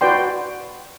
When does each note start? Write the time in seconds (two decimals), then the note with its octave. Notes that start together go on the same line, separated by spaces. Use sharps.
0.01 F#4 B4 D5 G5 C6